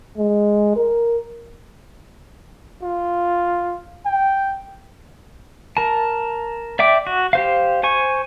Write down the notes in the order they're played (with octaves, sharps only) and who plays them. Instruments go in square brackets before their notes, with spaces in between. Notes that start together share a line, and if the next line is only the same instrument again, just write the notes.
[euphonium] G#3
A#4
[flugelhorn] F4
G5
[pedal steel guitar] A#4 A5
D5 E5 G5 D6
F#4
G4 C5 F5
C5 G#5 C#6